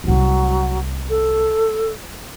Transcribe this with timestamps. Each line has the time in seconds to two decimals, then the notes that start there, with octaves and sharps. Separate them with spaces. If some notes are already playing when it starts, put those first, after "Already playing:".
0.04 C2 F#3 A3
1.10 A4